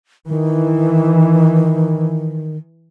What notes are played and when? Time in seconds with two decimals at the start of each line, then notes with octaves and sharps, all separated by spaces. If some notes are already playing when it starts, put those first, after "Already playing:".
0.27 D#3 E3